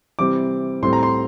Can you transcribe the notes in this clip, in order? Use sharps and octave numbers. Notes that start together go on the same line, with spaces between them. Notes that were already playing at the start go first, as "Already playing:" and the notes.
C3 E3 G3 C4 D6
A2 G3 C4 C6
A#5
C6